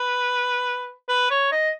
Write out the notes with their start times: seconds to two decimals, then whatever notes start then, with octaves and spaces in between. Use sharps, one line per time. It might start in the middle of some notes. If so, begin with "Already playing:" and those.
Already playing: B4
1.09 B4
1.30 C#5
1.52 D#5